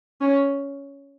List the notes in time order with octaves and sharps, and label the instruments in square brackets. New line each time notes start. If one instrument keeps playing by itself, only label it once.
[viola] C#4